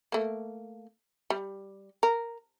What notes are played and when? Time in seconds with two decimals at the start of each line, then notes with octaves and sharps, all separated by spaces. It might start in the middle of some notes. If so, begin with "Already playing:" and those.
0.12 A3 A#3
1.30 G3
2.03 A#4